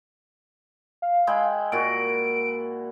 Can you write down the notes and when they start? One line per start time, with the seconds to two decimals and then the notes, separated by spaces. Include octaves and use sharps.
1.02 F5
1.27 G#3 E4 G5
1.72 A#2 F#4 D7